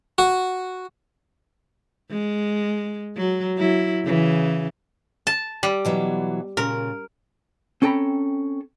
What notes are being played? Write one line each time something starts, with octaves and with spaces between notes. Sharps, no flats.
F#4
G#3
F#3
F#3 E4
C#3 E3
A5
G3
B2 E3 F#3
A#2 C#3 A#4
C4 C#4 A4 G5 A#5 B5